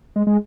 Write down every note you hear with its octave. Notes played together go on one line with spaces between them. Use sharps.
G#3
G#3